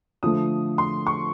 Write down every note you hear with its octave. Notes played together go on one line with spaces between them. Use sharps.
D3 F3 A3 D#6
C6
C#6